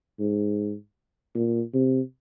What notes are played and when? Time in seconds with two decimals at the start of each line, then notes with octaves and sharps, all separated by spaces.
0.19 G#2
1.35 A#2
1.73 C3